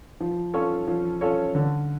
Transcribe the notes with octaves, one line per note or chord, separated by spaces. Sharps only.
F3
C#4 F4 A4 C#5
F3
C#4 F4 A4 C#5
D3